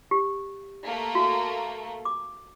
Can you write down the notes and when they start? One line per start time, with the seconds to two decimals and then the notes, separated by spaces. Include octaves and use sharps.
0.11 G4
0.84 A3 A#3
1.15 F#4
2.05 D6